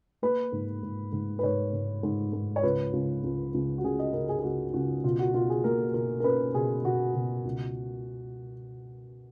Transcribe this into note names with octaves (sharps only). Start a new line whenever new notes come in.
A#3 B4
G#2
G#2
G#2
B4
G#2 C#5
G#2
G#2
G#2
C#5
C#2 B4
C#2
C#2
C#2
F#4
C#3 G#4
D#5
C#3 A#4
G#4
G#4
C#2 F#4
C#2 F#4
B2 F4
F#4
B2 F4
G#4
A#3 A#4
B2 A#4
A#4
C#4 B4
B2 G#4
B2 F#4
B2
C#2